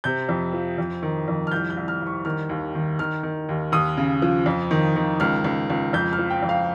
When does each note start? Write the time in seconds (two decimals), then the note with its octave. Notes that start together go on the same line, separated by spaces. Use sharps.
0.04 C3 G6
0.29 F2
0.53 F3
0.78 F2
1.03 D#3
1.28 F2
1.47 F6
1.51 C2 G6
1.70 G6
1.77 C2
1.88 F6
2.01 C2
2.07 C#6
2.25 D#3 F6
2.49 D#2
2.75 D#3
2.99 D#3 F6
3.23 D#3
3.49 D#2
3.72 D#2 D#6
3.97 C#3
4.22 F3
4.46 F2
4.71 D#3
4.96 D#3
5.20 C#2 F6
5.44 C#2
5.70 C#2
5.93 F2 G6
6.13 F6
6.18 F3
6.30 G5
6.42 F2
6.49 F5